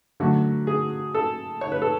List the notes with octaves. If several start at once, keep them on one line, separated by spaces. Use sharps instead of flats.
D3 F#3 A3 F#4
G#4
A4
C#5
B4
A4